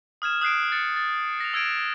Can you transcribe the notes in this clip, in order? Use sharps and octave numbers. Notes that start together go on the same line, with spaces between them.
D#6 F6 G#6 E7
D#6 F#6 C7 D7
A6 C#7
A6
A#6 F7
E6 G#6 D7 E7